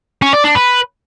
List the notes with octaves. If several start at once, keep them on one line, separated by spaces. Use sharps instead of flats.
C#4
D5
D4
B4